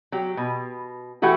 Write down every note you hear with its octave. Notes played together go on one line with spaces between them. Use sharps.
F#3 G4
B2
E3 A3 F#4 G4